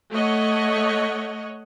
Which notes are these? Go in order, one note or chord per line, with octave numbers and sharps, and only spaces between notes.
A3 C#5 D#5 F#5